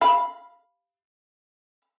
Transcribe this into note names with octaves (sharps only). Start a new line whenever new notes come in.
F5 B5